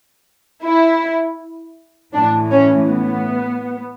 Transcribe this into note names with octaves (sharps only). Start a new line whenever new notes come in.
E4
A2 E3 D4
C#4
B3